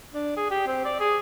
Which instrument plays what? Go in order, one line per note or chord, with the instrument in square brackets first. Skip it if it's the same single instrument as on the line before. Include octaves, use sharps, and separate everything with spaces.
[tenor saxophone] D4
G#4
G4
C4
D5
G#4